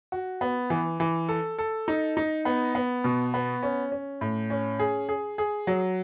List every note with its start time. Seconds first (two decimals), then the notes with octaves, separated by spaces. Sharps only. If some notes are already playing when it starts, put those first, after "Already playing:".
0.12 F#4
0.41 B3
0.70 E3
1.00 E3
1.29 A4
1.58 A4
1.88 D#4
2.17 D#4
2.45 B3
2.75 B3
3.04 B2
3.34 B3
3.63 C#4
3.92 C#4
4.21 A2
4.50 C#4
4.79 G#4
5.09 G#4
5.38 G#4
5.67 F#3